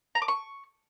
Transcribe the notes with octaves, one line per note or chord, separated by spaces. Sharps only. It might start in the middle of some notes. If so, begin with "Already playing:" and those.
A#5
D6
C#6